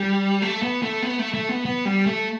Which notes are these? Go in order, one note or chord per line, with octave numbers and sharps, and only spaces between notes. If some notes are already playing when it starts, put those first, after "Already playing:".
Already playing: G3
A3
B3
A3
B3
A3
A3
B3
B3
G3
A3